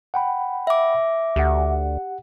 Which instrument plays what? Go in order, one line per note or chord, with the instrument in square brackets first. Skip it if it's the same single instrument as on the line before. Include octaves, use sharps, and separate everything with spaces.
[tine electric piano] F#5 G5 B5
[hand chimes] E5 D6
[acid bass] D2 [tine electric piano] G4 F#5